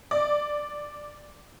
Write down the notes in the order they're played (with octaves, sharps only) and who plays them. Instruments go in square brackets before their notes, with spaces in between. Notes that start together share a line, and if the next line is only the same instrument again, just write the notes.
[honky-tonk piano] D5